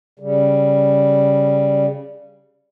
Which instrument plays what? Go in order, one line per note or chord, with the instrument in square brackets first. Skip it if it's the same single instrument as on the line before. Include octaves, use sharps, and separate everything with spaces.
[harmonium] C#3 G3